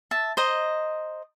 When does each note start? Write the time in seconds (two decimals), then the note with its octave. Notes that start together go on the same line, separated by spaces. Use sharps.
0.11 E5 A5
0.37 C5 D#5 A#5